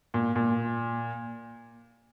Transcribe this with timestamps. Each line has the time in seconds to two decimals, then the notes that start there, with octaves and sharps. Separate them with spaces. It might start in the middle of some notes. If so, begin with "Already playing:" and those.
0.14 A#2
0.36 A#2